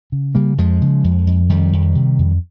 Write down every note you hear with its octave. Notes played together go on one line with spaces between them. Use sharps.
C#3
C#3 G3 A#3
F2 F3 G#3
C#3
F2
F2
F2 D#3 G3
F2
C3
F2